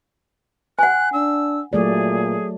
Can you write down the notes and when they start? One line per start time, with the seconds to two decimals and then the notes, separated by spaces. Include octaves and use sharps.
0.79 F#5 G#5 F#6
1.13 D4 E6
1.73 A#2 F#3 A3 G#4 D5